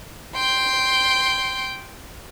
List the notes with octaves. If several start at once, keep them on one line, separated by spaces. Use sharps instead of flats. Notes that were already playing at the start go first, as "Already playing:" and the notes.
G5 C6